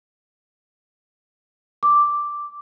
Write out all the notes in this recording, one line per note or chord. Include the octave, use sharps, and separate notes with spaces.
D6